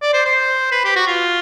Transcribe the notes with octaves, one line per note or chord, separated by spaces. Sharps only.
D5
C5
C5
B4
G4
F#4
F4